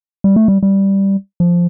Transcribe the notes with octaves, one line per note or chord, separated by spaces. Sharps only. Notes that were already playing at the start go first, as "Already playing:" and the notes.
G3
A3
G3
G3
F3